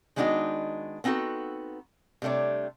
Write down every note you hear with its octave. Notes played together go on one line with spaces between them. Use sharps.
D#3 G#3 B3 D4 D#4 F#4
B3 C4 D#4 F4 F#4 A4
C3 G3 A3 D4 C#5